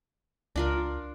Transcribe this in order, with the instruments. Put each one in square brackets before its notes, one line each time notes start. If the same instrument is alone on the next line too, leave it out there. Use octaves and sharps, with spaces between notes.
[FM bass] C#2 [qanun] D4 F4 A#4